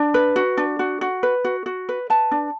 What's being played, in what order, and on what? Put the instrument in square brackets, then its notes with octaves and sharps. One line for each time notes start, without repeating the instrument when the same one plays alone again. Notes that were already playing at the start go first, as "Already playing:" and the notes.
Already playing: [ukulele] D4
B4
F#4
D4
F#4
F#4
B4
F#4
F#4
B4
B4 A5
D4